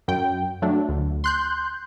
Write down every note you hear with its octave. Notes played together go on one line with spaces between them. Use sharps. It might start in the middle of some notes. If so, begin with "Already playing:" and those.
F#2 G5
F#3 A3 D4
D2
C6 F#6 G6